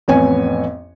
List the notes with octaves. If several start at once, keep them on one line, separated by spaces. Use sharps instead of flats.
A1 F2 B3 C#5 G#5